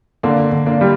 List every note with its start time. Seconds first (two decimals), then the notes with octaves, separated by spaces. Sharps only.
0.23 D3 A#3 D4
0.52 D3
0.66 A#3 D4
0.81 G3